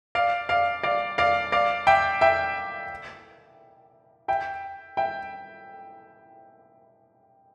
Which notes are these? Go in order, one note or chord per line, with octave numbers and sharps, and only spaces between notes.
D5 F5
D5 F5
D5 F5
D5 F5
D5 F5
E5 G5
E5 G5
E5 G5
E5 G5